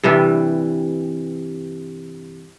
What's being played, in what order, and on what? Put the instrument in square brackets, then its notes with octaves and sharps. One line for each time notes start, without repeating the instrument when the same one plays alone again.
[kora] G2 C3 E3 G3